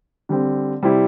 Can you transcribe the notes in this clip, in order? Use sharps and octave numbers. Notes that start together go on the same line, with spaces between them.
D3 G3 C4
C3 G3 C4 E4